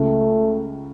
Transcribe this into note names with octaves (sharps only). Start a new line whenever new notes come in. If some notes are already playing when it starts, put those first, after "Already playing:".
Already playing: C#2 C#3 A3